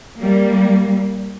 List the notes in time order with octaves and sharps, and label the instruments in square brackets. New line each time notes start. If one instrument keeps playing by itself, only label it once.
[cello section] G3 A#3